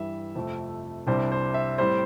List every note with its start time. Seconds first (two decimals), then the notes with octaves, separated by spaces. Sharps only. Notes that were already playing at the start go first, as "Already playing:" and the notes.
Already playing: G2 E3 G3 E5
0.35 F2 C3 F3 A3
1.07 C2 C3 G3 D4 C5
1.32 C5
1.54 E5
1.78 A2 G3 C4 C5